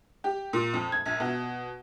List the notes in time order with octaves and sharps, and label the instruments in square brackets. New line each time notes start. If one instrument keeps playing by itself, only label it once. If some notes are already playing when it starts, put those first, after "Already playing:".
[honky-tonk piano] G4
A#2
F2
G#6
A#1
B2